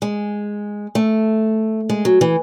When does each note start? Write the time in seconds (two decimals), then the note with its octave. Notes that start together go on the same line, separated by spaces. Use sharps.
0.02 G#3
0.95 A3
1.90 G#3
2.05 F#3
2.21 E3